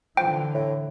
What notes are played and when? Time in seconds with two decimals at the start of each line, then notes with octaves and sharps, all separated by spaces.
0.17 D3 E3 F3 G5
0.54 A2